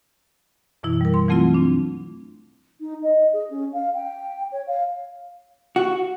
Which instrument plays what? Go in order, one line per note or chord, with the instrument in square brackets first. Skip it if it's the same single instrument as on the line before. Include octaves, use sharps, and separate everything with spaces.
[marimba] F#2 B2 E3 E4
G3 A#4
C6
E3 F#3 A3 C4 E4 F4
C4 D4
[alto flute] D#4
D#5
G#4
C#4
F5
G5
C#5
F5
[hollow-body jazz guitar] F#4